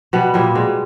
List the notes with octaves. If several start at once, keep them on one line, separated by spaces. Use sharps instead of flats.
B2 G3 B3
A#2 G3 A#3
B2 G#3